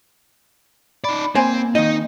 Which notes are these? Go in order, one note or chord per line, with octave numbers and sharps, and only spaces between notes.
D#4 D5 B5
A#3 C4 C5 G#5
D#3 D#4 D#5